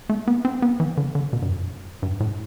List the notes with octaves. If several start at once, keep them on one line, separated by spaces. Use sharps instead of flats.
A3
B3
C4
B3
E3
D3
D3
B2
G2
F2
G2
A2